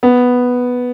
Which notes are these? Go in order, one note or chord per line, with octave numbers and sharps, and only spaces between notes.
B3